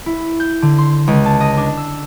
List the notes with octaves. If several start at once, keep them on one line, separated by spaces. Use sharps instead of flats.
E4
G6
D3
C6
C#2
A5
D#5
D4
E6